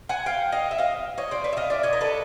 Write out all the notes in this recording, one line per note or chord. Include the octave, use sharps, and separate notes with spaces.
F#5 G#5
F5 G5
D#5 F5
E5
D#5 F5
C#5 D#5
C5 D5
B4 C#5
E5
D#5 F5
D5 E5
C#5 D#5
A#4
A4 B4